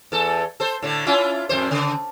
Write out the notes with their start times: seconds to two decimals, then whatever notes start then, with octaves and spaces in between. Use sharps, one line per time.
0.12 E2 A4
0.60 A4 C5
0.83 A2 D3
1.07 C#4 E4 F4
1.49 F2 A2 C5
1.71 C#3